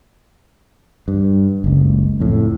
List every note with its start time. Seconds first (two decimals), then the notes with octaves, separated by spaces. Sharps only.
1.08 G2
1.64 F#1 C#2
2.20 F2 A2